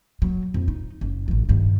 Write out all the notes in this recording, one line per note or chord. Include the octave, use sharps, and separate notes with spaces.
F#3
F2
D#4
F#1
A1 E3
G2 D#3